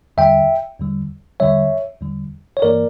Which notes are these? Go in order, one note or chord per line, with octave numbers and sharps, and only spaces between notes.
E2 D3 G3 E5 G5
E2 D3 G3
E2 D3 G3 C#5 E5
E2 D3 G3
C#5
G2 E3 A#3 A#4 D5